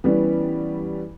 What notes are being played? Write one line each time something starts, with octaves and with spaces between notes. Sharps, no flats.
E3 G3 B3 C#4